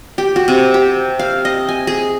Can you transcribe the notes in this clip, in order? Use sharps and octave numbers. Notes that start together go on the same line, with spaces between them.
G4
F#4
C3
G4
F5
D#5
G#5
G#4